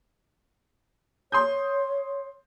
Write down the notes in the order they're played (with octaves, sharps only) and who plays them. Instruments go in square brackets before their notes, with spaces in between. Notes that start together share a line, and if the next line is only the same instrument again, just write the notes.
[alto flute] C#5 [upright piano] C6 D#6 G6